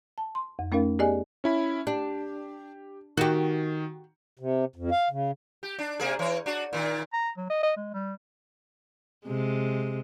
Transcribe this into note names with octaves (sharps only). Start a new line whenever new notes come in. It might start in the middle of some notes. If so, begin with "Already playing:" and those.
A5
C6
F2
A3 C#4 D#4 A#4 F5
B3 G4 G#4 D5 D#5 G#5
C#4 E4 B5
D4 G4
D#3 F#4 G4
C3
F2
F5
C#3
G4
D4
C3 A#3 G#4
E3 C#5
D4 F#4
A#2 D#3
A#5
F#3
D#5
D#5
G#3
G3
C3 G#3